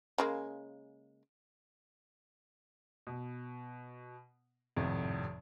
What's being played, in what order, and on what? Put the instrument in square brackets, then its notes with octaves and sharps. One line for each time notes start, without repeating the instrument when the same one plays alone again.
[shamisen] C#3 G#3 A#3
[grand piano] B2
G#1 F2 A2 C3